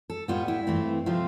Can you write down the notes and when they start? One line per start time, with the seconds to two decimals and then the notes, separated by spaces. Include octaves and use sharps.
0.10 A4
0.28 A2 G3 B3 F4
0.48 E4
0.67 G2 E3 A3 C4
1.06 C3 F3 A3 C4 F4